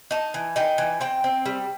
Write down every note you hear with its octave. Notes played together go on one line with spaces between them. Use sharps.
D#4 A5
E3
D#4 G5
E3
C4 G5
C4
G3